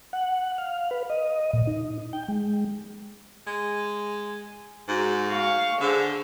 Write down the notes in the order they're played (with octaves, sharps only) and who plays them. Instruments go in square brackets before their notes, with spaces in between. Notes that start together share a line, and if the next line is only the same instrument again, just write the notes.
[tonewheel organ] F#5
F5
B4
D#5
A#2
D#4
G5
G#3
[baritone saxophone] G#3
[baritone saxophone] G#2 [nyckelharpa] F#4 G#4
[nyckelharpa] F5 C#6
[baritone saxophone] D3 [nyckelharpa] G#4 C5